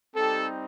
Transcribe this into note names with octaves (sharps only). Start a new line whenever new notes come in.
G3 C4 D#4 G4 A4